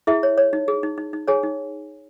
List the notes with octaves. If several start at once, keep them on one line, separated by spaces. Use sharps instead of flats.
E4 G#4 E5
C#5
C#5
D#4
G#4
D#4
D#4
D#4
G#4 C#5 G#5
D#4